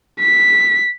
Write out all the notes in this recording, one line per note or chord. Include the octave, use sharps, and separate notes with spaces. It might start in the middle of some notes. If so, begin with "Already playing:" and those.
B6